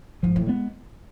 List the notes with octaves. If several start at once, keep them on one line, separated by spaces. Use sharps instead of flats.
G#2 F3
A2
G#3 B3